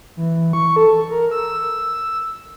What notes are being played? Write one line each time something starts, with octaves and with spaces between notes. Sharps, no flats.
E3
C#6
A4
A#4
E6